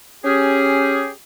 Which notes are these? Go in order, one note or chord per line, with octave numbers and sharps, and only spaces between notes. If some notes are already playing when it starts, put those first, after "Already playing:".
C#4 G4 G#4